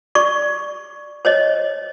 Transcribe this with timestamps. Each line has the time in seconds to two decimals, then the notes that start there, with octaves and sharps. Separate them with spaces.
0.15 D5 C#6
1.25 C5 C#5 D#5